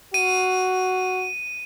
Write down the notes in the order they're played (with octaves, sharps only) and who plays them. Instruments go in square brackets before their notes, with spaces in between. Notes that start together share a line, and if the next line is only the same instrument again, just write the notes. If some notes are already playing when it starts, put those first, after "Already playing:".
[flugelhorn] F#4 [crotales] D#7